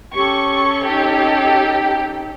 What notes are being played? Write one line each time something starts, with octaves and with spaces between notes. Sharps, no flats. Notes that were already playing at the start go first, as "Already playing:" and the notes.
C#4 G4 A4 C#6
D#4 G4